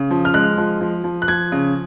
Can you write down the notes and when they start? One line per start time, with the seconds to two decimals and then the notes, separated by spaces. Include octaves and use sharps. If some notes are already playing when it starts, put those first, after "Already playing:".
Already playing: C#3
0.11 F3
0.25 F6
0.34 G#3 F#6
0.57 F3
0.81 F3
1.04 F3
1.22 F#6
1.28 F3 G#6
1.52 C#3